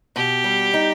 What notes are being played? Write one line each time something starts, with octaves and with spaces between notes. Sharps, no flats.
B2 G4
G3
D#4